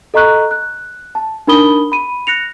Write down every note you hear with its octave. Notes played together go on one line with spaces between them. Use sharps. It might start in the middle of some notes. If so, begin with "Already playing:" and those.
A4 D#5 A#5 C#6 F#6
F#6
A5
D4 D#4 A#4 B5 D#6 G7
B5 D#7
F#6 A#6 C#7 F7